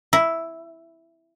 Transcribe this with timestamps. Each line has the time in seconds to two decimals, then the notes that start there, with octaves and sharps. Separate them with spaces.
0.13 E4